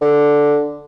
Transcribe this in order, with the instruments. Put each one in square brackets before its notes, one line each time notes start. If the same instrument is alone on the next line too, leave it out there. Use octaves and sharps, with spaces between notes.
[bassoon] D3